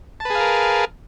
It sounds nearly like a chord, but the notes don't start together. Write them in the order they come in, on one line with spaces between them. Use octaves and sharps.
A5 B4 G#4 F5 A#4